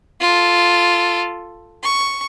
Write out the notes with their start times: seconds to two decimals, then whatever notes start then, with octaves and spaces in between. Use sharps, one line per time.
0.21 F4 A4
1.83 C#6